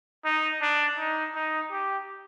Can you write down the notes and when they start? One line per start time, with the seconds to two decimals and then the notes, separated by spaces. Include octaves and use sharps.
0.25 D#4
0.62 D4
0.99 D#4
1.35 D#4
1.72 G4